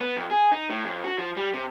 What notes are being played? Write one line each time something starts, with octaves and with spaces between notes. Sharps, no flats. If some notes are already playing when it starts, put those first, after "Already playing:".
B3
F2
G#4
D#4
A2
F2
F#4
F3
G3
C3